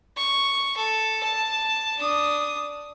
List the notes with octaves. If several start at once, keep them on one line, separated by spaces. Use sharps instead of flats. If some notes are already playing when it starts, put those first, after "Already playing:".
C#6
A4
A5
D4 D#6